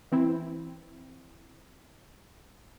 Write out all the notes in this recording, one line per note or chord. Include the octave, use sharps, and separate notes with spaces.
E3 C4 E4